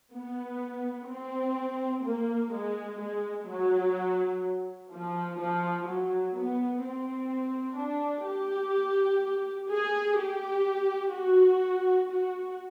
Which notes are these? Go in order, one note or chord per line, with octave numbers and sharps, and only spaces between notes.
B3
C4
A#3
G#3
G#3
F#3
F3
F3
F#3
B3
C4
D4
G4
G#4
G4
F#4
F#4